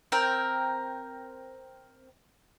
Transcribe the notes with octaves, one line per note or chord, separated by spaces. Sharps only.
C4 A#4 G5